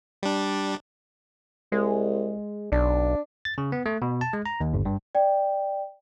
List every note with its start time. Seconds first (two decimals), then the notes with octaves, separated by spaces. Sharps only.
0.23 G3 D4
1.72 C2 G#3
2.72 B1 D4
3.45 A6
3.58 C#3
3.72 B3
3.86 A3
4.02 B2
4.21 A5
4.33 G#3
4.46 A#5
4.61 D#2
4.74 G1
4.85 G2
5.15 D5 G5